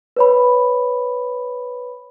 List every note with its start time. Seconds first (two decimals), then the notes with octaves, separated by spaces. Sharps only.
0.16 B4 C#5 B5